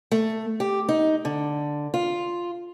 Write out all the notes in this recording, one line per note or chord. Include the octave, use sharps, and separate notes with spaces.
A3
G4
D#4
D3
F4